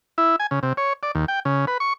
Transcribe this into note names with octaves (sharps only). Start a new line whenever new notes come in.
E4
G#5
C#3
C3
C#5
D5
D#2
G5
C#3
B4
C#6